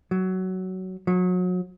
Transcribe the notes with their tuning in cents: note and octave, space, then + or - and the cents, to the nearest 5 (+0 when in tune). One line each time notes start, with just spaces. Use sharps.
F#3 +15
F#3 -30